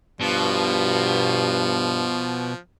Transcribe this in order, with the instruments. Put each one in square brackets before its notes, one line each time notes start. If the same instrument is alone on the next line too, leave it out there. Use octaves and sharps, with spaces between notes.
[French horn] G2 [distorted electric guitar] B2 [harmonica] F3